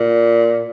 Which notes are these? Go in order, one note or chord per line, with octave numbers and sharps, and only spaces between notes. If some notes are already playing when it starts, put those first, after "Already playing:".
Already playing: A#2